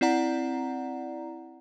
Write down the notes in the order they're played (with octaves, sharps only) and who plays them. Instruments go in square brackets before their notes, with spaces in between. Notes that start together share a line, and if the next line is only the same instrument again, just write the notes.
[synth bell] C4 E4 D5 F#5 A#5